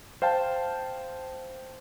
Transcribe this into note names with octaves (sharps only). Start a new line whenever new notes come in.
C5 F5 G5 A5